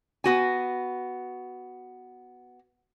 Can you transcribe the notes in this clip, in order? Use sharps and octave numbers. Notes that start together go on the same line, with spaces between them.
B3 F#4 G#5